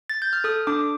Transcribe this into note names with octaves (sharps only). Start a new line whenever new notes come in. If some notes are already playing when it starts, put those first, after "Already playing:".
A6
G6
F6
A4 D#6
D4 D6